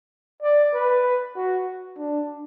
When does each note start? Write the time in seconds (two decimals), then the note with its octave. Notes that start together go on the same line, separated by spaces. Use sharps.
0.43 D5
0.74 B4
1.36 F#4
1.98 D4